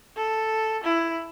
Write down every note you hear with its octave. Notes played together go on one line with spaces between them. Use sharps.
A4
E4